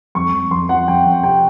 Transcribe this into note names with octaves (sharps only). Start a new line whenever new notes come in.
F2 C#6
F2
F2 C6
F3 F#5
F2 G5
F2
C3 G5